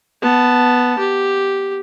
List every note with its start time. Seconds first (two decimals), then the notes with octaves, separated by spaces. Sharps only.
0.22 B3 A5
0.98 G4